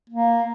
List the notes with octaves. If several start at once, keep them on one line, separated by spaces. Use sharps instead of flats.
A#3